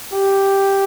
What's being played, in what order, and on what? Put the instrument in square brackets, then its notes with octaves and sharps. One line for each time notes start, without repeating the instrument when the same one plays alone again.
[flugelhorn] G4